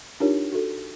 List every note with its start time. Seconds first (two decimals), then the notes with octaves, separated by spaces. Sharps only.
0.20 D4 D#4 F4 G4 A#4 C#5
0.52 F#4 A4